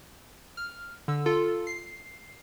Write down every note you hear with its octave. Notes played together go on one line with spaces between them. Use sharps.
F6
D3 E6
F4 A4
C7